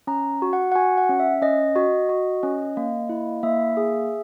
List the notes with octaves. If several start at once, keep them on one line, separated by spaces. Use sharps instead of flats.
C#4 A#5
F#4
F#5
F#5
F#4 G#5
F#5
C#4
E5
C#4 D#5
F#4 D#5
F#4
C#4
A#3
E4
A#3 E5
G#4